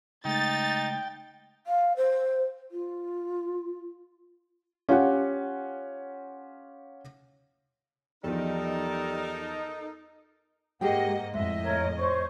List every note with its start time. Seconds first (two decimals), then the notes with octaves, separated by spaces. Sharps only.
0.25 C#3 G#3 A3 D#4 G5 A6
1.65 F5
1.97 C5
2.71 F4
4.89 C#4 F4 G4 F#5
8.24 E2 F3 G3 D#4 A4 A#4
10.81 G#2 A#3 G4 G#4 D#5 F#5 G5
11.33 F2 A2 G#3 D#5 E5
11.63 A#4 C#5
11.97 C5 C#5 C#6